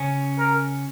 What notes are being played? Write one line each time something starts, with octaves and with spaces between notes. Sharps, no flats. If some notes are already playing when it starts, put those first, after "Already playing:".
Already playing: C#3 C#4
A#4